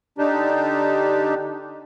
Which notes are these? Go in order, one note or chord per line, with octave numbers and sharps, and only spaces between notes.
D3 D4 D#4 G4